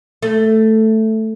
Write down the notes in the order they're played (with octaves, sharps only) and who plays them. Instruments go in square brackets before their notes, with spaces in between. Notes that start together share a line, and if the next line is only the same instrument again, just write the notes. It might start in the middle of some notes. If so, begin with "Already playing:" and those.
[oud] A3